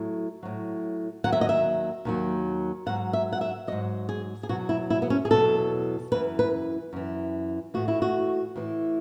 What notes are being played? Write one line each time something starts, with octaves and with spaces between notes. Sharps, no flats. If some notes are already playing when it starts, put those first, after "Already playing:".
Already playing: A2 F#3
A2 F#3
D#2 D#3 F#3 F#5
E5
D#5
E5
D#2 D#3 F#3
G#2 F#3 F#5
E5
F#5
E5
G#2 F#3 D#5
G#4
G#4
E2 B2 F#3 F#4
E4
E4
B3
C#4
G#4
E2 B2 F#3 A4
F#2 E3 B4
B4
F#2 E3
A2 E3 F#4
E4
F#4
A2 E3